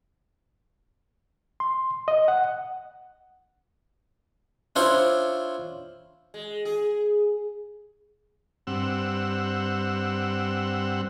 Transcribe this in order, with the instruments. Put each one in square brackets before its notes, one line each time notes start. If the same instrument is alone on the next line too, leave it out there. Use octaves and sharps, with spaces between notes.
[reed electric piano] C6
D#5
F#5
[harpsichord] D4 E4 F4 C5 C#5
[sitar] G#3
G#4
[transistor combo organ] G2 C4 F#5 E6